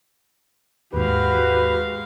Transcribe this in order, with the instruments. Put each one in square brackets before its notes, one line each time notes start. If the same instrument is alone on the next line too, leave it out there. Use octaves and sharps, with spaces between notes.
[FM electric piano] D#2 G#2 [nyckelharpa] G#3 F5 [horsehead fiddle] F#4 G4 [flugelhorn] B4